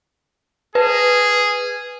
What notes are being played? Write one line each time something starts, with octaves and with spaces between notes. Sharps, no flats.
G#4 B4